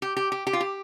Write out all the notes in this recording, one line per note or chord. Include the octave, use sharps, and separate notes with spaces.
G4
G4
G4
G4
F4
G4